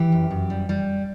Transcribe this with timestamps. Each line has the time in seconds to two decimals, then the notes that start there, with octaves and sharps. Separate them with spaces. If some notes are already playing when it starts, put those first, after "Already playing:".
Already playing: E3 G4
0.12 F#2
0.30 F#2
0.50 G3
0.69 G3